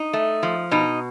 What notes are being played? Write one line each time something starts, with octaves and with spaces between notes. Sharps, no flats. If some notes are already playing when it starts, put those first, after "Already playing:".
Already playing: D#4
A3
F3
B2 D#4